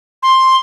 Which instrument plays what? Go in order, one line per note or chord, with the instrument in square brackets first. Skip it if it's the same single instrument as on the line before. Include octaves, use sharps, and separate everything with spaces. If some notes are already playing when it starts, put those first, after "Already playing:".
[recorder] C6